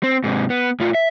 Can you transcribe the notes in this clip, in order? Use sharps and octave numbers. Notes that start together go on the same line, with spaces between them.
C4
G#2 C3
B3
A2 F4
E5